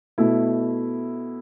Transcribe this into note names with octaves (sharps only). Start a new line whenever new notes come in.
B2 A3 E4